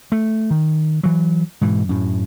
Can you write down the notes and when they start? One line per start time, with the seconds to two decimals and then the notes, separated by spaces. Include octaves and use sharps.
0.12 A3
0.51 D#3
1.03 E3 F#3
1.61 G#2 B2 E3
1.89 F#2 A2